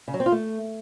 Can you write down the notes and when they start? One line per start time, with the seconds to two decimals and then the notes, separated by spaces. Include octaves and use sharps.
0.08 C#3
0.14 F#3
0.20 C4
0.26 F4
0.32 A3